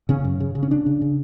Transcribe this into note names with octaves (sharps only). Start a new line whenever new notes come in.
C#3 C#4
F#2
C#3
C#3
C#4
C#3 D4
C#3
C#3